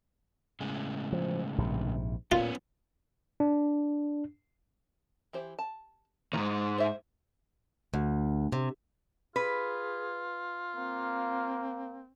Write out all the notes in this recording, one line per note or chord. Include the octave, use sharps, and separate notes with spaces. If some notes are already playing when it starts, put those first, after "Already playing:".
A2 C#3 G#3
F3
A#1 G#2 C3
A#2 B3 C#4 F4
D4
E3 G4 C5
A5
D2 G#2 A#5
C5 E5
D2
C3
F4 G#4 B4
A#3 C4